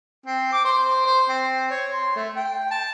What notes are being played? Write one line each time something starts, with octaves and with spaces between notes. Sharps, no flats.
C4
D6
C5
C5
C4
C#5
C6
A3
G5
A5